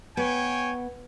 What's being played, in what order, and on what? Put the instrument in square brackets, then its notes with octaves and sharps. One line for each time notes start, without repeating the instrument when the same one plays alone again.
[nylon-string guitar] B3 [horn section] C#5 G5 G#5